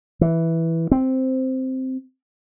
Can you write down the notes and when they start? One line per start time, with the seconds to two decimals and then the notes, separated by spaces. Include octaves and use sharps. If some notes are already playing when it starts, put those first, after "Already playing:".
0.21 E3
0.91 C4